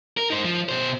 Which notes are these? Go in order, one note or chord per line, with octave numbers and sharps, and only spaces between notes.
A#4
D#4 C5
F3
B2 C5